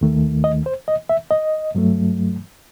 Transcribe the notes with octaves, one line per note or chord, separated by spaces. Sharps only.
D#2 D#3 A3
D#5
C5
D#5
E5
D#5
G2 F#3 A3